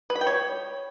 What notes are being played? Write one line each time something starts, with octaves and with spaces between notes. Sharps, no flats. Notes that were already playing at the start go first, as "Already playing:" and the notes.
B4
B5
G5
C#5